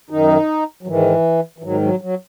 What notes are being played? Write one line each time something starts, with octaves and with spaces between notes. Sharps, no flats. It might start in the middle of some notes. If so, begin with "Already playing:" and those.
F#2 D#3 D#4
F#3
G#2 D#3 E3
E3
G#2 D#3 F#3
F#3
F#3